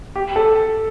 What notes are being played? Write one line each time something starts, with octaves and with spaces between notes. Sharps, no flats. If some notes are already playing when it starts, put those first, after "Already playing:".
G4
A4